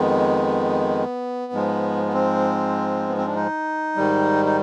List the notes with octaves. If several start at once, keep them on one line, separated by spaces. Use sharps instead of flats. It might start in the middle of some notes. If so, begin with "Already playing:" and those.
Already playing: F2 D#3 G#3 B3
G#2 F3 G#3
B3
C4
B3
C4
D4
D#4
G#2 D#3 G3
D#4